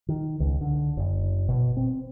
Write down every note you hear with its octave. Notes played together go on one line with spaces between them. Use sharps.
D#3
C#2
D3
F#1
B2
C4